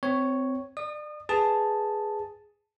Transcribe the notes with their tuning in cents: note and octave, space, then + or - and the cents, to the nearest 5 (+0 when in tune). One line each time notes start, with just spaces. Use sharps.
C4 -20 C#5 +0
D5 +30 D#6 -30
G#4 +0 B4 +0 A5 +0